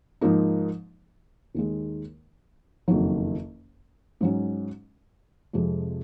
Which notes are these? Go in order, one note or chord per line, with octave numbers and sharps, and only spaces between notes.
G#2 F3 A#3 D#4
D#2 D#3 G#3
F#1 F2 D#3 F#3
G#2 F#3 C#4
F2 C3 F3 G#3